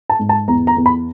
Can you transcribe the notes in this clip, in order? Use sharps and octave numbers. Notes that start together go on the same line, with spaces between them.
A5
G#2
A5
E2 A#5
A#5
E2
B5